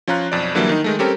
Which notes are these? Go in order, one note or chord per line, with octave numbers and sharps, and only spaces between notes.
F3 C#4 F4 A#5 F#6
B1 F2 D5
D3 E3 F#3 G3 A#3 E4
D#3 D#4
D#3 G#3 A3
G3 C4 C#4 G4 A4 A#4